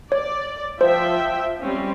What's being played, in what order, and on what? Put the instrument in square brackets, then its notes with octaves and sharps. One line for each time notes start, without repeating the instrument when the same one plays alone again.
[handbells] C#5 [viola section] D5
[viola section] F3 E5 G5 [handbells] C5
[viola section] G3 C4 C#4